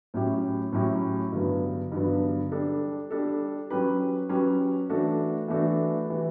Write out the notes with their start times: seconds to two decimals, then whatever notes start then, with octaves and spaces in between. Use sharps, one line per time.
0.14 A2 F#3 C#4 E4 G4
0.72 A2 F#3 C#4 E4 G4
1.32 G2 D3 F#3 B3
1.92 G2 D3 F#3 B3
2.52 G3 D4 A4
3.11 G3 D4 A4
3.70 F#3 C#4 G4 B4
4.29 F#3 C#4 G4 B4
4.89 E3 A3 D4 F#4 A4
5.48 E3 A3 D4 F#4 A4
6.10 E3 G3